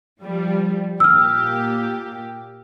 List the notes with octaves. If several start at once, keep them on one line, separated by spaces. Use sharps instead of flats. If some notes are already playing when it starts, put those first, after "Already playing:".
F3 G3
A#2 A#3 G4 E6 F6